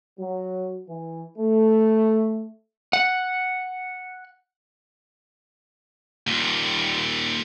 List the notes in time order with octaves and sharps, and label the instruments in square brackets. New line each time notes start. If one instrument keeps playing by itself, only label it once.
[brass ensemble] F#3
E3
A3
[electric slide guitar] F#5
[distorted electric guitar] D#2 A#2